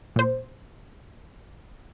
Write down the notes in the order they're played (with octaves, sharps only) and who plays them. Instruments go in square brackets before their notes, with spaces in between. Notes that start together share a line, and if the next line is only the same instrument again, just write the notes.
[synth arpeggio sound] A#2 C5